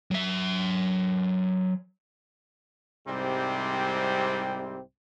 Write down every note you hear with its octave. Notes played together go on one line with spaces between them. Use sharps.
F#3 E5
C2 G#2 C3 G3 C4